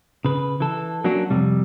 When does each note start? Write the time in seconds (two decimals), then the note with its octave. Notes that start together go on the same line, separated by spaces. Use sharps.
0.25 C#3 B4
0.60 E3 A4
1.04 F#3 A#3 C#4 D4 F#4
1.30 F2 C3 G3